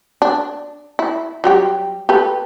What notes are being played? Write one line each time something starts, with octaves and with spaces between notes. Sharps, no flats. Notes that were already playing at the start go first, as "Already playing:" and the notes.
D4
E4
F#3 G3 G4
G4 A4 B4